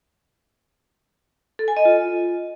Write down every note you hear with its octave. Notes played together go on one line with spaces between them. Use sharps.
A4
G#5
D#5
F4